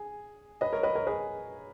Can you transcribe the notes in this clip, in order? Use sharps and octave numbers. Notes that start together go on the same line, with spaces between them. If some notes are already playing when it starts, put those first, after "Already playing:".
Already playing: G#4
B4 D#5
A#4 C#5
B4 D#5
A#4 C#5
G#4 B4